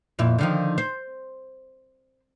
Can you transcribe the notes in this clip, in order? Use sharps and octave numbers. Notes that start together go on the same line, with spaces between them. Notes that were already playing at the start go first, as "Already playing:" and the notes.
F2 A#2 E4
D3 D#3 F3
C5